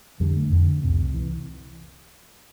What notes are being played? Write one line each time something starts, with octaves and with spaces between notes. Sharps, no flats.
F2 D3 G3
A3
F2 D3
C2 C3
E3